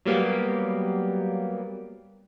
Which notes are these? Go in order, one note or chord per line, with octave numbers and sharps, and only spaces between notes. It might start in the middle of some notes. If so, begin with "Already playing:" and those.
F#3 G3 A#3 B3 G4